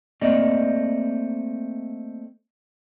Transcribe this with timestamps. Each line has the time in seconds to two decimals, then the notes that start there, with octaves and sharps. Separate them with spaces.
0.21 A3 A#3 C4 D5 D#5